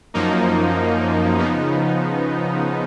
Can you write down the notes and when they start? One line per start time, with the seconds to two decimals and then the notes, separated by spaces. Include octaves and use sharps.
0.14 F#2 F3 A#3 D#4
1.38 C#3 F3 B3 D#4